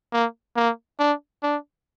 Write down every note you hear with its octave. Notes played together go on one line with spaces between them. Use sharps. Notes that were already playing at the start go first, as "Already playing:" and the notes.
A#3
A#3
D4
D4